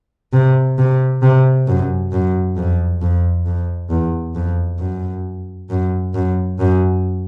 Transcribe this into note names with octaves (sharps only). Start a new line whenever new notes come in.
C3
C3
C3
F#2
F#2
F2
F2
F2
E2
F2
F#2
F#2
F#2
F#2